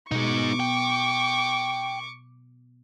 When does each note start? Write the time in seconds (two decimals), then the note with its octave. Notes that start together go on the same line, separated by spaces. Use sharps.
0.11 B2 G#3 D#4 C#6 D6
0.60 G5